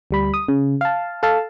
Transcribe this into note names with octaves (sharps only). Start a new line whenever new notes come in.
D2 G3 B5
D#6
C#3
F5 A5
A4 F5 A5